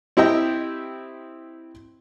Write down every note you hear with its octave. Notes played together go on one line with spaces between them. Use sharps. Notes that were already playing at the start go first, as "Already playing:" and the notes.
C4 E4 G4 D#5 G5